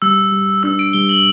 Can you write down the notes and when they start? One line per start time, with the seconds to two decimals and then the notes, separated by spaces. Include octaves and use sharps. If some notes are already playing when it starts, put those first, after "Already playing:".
0.02 G3 E6
0.32 G3
0.63 D4 E6
0.79 D7
0.93 G3 G7
1.09 F#7